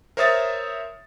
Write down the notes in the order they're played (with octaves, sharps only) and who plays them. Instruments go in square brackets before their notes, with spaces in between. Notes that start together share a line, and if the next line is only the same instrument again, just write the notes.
[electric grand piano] A#4 C5 C#5 E5 D#6 A6